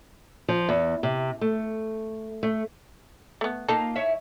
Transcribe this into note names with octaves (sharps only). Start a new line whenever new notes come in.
F3
E2
C3
A3
A3
A3 B3
A#3 D#4 F4 A4
E4 C#5 E5